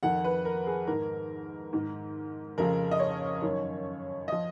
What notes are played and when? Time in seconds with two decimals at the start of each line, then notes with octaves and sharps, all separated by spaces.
0.03 F2 D#3 F#5
0.24 B4
0.45 A#4
0.67 G#4
0.87 G#2 D#3 A#4
1.73 G#2 D#3
2.58 F2 C#3 F3 A#4
2.91 D#5
3.00 C#5
3.42 F#2 D#3
4.28 F3 D#5